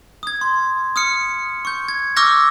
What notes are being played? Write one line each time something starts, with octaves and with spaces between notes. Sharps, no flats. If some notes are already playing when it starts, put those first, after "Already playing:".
D#6 G#6
C6
D#6 F6 C#7
C#6 G6
G#6
C#6 D6 E6 F6 G6 A#6